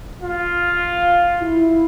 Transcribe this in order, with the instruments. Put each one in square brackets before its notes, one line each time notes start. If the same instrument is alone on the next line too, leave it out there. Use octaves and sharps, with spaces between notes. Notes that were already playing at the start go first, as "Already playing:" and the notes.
[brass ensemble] F4
E4